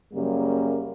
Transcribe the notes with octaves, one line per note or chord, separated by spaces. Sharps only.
F#2 C#3 G3 A#3